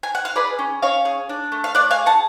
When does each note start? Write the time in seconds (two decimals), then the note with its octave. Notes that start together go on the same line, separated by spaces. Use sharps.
0.03 G#5
0.15 F#5
0.25 F5
0.35 G#4 B4 D5
0.59 C#4
0.82 C#4 C#5 F5
1.05 G#4
1.29 D4
1.52 A3
1.64 F5
1.75 A3 D5 F#5
1.91 F5 G#5
1.98 G#4
2.06 F#5 A5